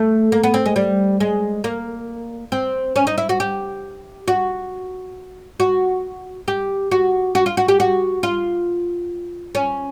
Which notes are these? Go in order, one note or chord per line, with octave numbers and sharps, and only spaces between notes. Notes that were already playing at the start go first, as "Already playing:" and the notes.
Already playing: A3
A#3
B3
C4
G#3
G3
G#3
A#3
C4
C#4
D#4
E4
F#4
G4
F#4
F#4
G4
F#4
F#4
F4
F#4
G4
F#4
F4
C#4